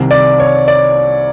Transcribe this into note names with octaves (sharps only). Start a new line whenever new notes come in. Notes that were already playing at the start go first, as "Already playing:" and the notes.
Already playing: C2 C3 D#3
D5
C#5
D5